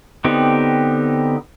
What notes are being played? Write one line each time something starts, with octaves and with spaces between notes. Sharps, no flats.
D3 B3 C4 D#4 G4